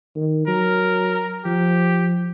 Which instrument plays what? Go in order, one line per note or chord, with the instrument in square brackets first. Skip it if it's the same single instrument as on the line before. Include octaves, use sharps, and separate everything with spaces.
[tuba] D#3
[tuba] F#3 [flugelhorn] A#4
[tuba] F3 [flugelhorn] G4